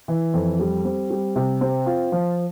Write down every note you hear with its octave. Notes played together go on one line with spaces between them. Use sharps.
E3
F2
G3
C4
G3
C3
C4
F4
F3